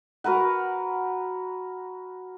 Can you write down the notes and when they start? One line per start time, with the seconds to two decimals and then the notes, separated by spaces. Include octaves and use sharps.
0.24 F#4 A#4 B4 F#5